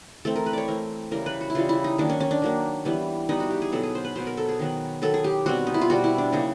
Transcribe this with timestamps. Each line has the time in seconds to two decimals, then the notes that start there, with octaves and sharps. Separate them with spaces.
0.25 E3 A3 C4 A4
0.36 A#4
0.46 B4
0.53 C#5 D5
0.68 E3 A3 C4 A#4
1.11 C#3 E3 G3 A#4
1.26 B4
1.41 F#4
1.50 E4
1.55 C#3 E3 G3 F4
1.69 E4
1.84 D#4
1.98 D#3 F#3 A#3 D4
2.10 C#4
2.20 C#4
2.31 D4
2.42 D#3 F#3 A#3
2.85 E3 G3 B3
3.29 E3 G3 B3 D#4
3.40 F#4
3.50 G4
3.62 G#4
3.72 B2 F#3 B3 A4
3.83 G#4
3.95 C5
4.05 B4
4.16 B2 F#3 B3 C5
4.27 A#4
4.37 A4
4.49 G#4
4.60 D#3 F#3 B3
5.02 D#3 F#3 B3 A4
5.14 G#4
5.24 G4
5.46 B2 G3 C4 F#4
5.67 D#4
5.74 E4
5.81 F4
5.90 B2 G3 C4 F#4
6.04 E4
6.18 D4
6.32 C#3 F#3 A#3 C#4 D#4